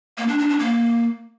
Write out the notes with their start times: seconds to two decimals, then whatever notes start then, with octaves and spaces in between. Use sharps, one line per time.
0.18 A#3
0.28 D4
0.38 D4
0.49 D4
0.59 A#3